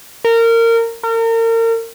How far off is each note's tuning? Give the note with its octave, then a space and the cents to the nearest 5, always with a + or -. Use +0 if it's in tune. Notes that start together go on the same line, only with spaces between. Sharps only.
A#4 -25
A#4 -35